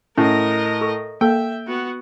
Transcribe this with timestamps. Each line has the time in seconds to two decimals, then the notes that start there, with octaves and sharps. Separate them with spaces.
0.18 A2 C#4 A#4 D#5
0.81 A4 C#6
1.21 A#3 A4 E5 G5
1.67 B3 F#4